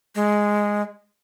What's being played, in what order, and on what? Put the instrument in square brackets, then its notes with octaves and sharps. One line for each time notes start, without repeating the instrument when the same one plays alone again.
[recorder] G#3